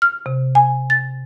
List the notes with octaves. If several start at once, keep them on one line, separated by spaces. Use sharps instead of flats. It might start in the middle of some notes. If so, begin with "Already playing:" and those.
F6
C3
G#5
A6